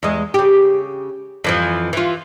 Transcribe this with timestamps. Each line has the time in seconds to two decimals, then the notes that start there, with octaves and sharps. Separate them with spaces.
0.03 E2 G#3
0.34 C#3 G4
1.44 F2 E3 F3
1.93 E3 F4